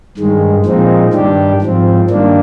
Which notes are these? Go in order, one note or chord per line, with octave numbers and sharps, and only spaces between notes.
G2 D#3 G#3
A#2 F3 G#3 C4 D#4
G2 D#3 G3 D4 G4
G#2 F3 C4
G2 D#3 A#3 D4